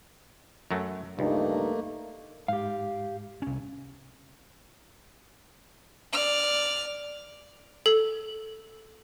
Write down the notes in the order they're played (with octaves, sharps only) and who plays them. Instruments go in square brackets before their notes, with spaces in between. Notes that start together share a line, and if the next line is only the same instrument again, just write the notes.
[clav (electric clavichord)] F#2 F#3 A3
[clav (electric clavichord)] C#2 [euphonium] G2 [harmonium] A3 A#3 [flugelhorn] D#4
[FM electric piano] G#2 [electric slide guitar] G4 F5
[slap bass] C2 C#4
[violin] D5 F6
[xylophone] A4